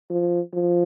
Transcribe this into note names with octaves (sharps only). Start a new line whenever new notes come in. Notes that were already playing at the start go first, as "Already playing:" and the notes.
F3
F3